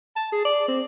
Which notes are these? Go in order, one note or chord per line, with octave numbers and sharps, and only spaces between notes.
A5
G#4
D5
C4